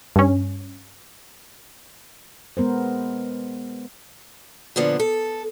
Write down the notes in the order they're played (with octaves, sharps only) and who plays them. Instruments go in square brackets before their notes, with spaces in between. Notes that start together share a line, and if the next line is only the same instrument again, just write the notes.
[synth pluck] G2 C#4
[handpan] G#3 B3 A#4 C5
[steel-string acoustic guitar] A#2 D3 F3 B3
A4